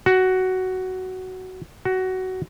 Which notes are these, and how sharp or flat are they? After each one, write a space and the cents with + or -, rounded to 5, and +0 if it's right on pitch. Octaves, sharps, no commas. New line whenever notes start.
F#4 +10
F#4 +15